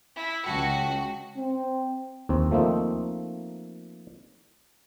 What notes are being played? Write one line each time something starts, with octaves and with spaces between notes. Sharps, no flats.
E4
C#2 F#4 F#5 G5 A5
C4
D#2 C4
F3 A3 A#3 C4 D#4